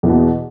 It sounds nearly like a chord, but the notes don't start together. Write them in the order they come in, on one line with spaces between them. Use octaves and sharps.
E2 E3 B2